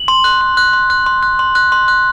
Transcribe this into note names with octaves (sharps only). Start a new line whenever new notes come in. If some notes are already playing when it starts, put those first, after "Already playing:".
Already playing: F#7
C6
F#6
C6
F#6
C6
F#6
C6
F#6
C6
F#6
C6
F#6